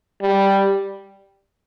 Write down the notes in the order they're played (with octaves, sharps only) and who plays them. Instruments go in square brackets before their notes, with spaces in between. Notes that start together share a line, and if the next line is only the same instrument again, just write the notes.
[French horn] G3